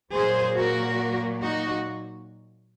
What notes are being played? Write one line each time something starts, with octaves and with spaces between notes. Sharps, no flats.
A#2 F#3 A#3 G#4 C5
F#4 A#4
D#4 F#4